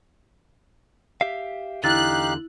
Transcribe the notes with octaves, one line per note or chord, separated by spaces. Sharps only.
G4 E5 F5
E2 D3 D#4 E4 G4 F5 F#6 A6